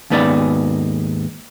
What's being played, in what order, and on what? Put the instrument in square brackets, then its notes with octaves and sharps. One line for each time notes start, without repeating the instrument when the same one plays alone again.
[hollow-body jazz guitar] D#2 G#2 B3 D#4 D5